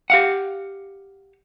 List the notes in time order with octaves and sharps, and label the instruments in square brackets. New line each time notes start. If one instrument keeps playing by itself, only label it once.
[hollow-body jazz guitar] G4 F5 F#5